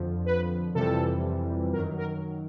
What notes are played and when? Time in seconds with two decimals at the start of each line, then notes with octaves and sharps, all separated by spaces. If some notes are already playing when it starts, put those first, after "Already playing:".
Already playing: F2 D3 F3
0.26 B4
0.74 F2 C3 E3 G3 A4
1.73 F#2 D#3 F#3 A#4
1.98 A#4